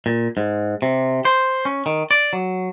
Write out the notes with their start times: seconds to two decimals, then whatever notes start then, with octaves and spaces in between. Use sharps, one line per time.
0.06 A#2
0.37 G#2
0.82 C3
1.25 C5
1.65 C#4
1.86 D#3
2.11 D5
2.33 F#3